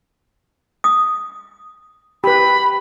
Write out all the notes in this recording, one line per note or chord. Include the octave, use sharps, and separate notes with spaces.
D#6
G4 B4 B5